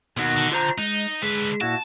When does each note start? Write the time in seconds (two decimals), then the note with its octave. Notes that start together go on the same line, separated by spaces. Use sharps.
0.17 D#2 B2 D#3 F#4
0.37 D3
0.52 F4 C5 A#5
0.78 G#3 D#4
1.23 D3 G#3 B4
1.61 A#2 E4 F#4 A5